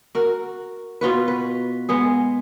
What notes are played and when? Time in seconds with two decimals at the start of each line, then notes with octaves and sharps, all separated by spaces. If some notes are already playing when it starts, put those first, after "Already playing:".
0.15 F#4 A#4
1.01 B2 F4 F#4 B4
1.28 B4
1.89 G#3 B3 G#4